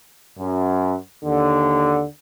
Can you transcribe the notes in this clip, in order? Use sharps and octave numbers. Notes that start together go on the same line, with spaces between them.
F#2
D#2 D3